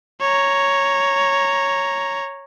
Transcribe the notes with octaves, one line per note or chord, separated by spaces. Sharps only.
C#5 A#5